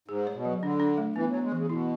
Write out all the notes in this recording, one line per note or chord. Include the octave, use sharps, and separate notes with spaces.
G#2 G#4
C#5
B2
F#3
D3 D4
D4
A3
E3 B3
F#3 B3
G#3
C#3 E3
B2 E4